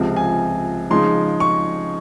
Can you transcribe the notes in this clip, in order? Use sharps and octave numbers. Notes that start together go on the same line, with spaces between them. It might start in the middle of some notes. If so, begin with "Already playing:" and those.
Already playing: C#2 C3 F3 C4
G#5
C#3 F3 G#3 D#4 C6
C#6